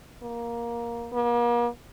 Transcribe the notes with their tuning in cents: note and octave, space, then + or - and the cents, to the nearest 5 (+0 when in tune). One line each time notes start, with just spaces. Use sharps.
A#3 +10
A#3 +40